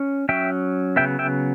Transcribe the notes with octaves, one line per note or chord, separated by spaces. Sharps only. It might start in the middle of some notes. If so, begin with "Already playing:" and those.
Already playing: C#4
F#3 C#4 E5 G5
C#3 F#3 B3 E5 G5
E5 G5